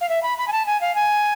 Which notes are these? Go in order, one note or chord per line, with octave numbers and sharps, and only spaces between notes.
F5
E5
B5
B5
G#5
A5
G#5
F5
G#5